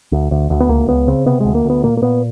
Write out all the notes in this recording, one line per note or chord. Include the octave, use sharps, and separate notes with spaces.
D2
D2
D2
B3
C#2 A#3
C#2 B3
C#3 C4
C3 B3
D2 G#3
A#3
D2 B3
A#2 A#3
A#3
A#2 B3